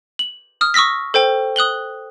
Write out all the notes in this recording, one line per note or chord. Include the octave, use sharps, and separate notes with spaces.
F#7
D#6 F6
C#6 D#6 E6 A#6 B6
A4 C5 G5
D#6 F#6 F#7 G7